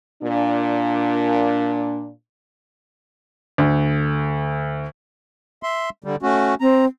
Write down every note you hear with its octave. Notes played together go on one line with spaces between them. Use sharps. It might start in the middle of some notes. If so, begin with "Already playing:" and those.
A#2 D4
D2
E5 C6
D3 G3
A3 C#4 F#4
C4 A#5